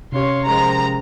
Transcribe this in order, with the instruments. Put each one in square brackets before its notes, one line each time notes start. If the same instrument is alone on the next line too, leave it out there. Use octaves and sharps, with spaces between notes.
[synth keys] C3 C#4 G4 [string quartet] C#5 F5 C6
[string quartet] D#3 F3 G#3 [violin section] A#5